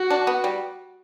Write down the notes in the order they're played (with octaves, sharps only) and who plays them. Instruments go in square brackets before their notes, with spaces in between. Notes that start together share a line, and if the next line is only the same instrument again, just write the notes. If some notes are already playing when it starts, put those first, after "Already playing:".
Already playing: [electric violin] F#4
[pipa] D4
B3
G3